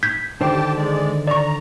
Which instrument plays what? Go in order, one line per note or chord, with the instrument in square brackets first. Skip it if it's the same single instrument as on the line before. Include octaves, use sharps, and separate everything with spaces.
[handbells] G6 G#6 B6
[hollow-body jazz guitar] D3 D#3 C5 [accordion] G4 G5 A5
[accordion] G#3 D5
[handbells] D5 C#6 [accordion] A#5